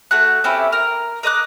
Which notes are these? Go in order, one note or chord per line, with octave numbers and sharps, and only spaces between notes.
A3 F#4 F#6
C4 C#4 E4 G4
A#4 F6
A#4 D#5 D6 F#6